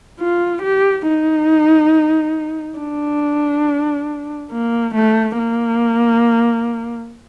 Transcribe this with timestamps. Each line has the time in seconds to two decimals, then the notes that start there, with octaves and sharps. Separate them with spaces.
0.20 F4
0.62 G4
1.06 D#4
2.79 D4
4.51 A#3
4.95 A3
5.38 A#3